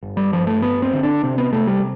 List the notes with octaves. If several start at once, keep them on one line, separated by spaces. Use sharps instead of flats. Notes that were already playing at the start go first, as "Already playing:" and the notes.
G1
G3
G2 F3
A3
G1 B3
C4
D3
D4
C3 C4
B3
C3 A3
G3